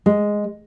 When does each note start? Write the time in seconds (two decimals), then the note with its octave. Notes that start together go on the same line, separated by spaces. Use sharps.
0.06 G#3